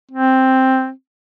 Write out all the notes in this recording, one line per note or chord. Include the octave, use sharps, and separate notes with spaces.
C4